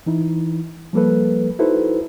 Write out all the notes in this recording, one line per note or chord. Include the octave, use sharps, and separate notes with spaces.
E3 D#4 E4
F3 G3 A#3 A4 B4
D#4 E4 F#4 A4 B4 C5